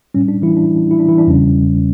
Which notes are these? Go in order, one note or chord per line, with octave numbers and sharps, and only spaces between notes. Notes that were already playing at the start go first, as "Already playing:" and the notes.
A2 G3 C#4
D4
E3 E4
D4
E4
D4
E3 E4
D4
E2 C#3 G3 C#4